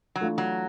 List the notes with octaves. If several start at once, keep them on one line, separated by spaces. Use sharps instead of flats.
F#3
E3 A3 D4 F4
F#3